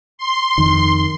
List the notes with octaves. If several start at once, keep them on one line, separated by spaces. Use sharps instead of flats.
C6
F2 D#3